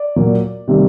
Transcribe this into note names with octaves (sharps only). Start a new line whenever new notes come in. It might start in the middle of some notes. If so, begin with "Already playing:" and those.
Already playing: D5
A#2 F#3 A#3
C3 D#3 G3 A#3